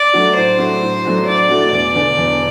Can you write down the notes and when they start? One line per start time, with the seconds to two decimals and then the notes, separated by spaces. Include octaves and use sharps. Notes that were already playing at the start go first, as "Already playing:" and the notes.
Already playing: D5
0.13 F#3 A3 D4 F#4
0.36 A2 C5
0.59 F#3 A3 D4 F#4
0.81 A2
1.04 F#3 A3 D4 F#4
1.27 A2 D5
1.49 F#3 A3 D4 F#4
1.72 E1 D5
1.94 E2 D3
2.18 E1